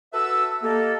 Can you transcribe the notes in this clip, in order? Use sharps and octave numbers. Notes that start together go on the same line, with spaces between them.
F#4 A4 B4 E5 E6
A#3 G4 A4 D#5